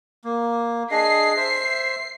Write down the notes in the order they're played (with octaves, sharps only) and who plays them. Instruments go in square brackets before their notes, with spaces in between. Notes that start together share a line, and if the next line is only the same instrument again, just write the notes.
[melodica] A#3
[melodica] D4 G#4 D#5 [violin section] C7
[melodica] C5 E5